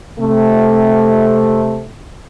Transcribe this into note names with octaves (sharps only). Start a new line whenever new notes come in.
C3 A3